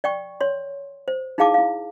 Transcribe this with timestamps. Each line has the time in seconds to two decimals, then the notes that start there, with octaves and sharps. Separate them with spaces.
0.04 D5 G5 C#6
0.41 C#5 C6
1.08 C5
1.38 D#4 E4 G#4 F5 A5 D6
1.54 E4 F5